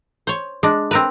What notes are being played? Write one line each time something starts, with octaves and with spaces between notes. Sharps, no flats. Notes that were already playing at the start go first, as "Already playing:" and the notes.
C5 C#5
G#3 D4
C4 A#4 B4